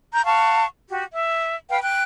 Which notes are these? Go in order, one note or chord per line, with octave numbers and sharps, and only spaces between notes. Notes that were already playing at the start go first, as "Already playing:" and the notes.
A#5 G6
F5 F#5 A5 C#6
F#4 G4
E5
B4 F5 G5
G5 F#6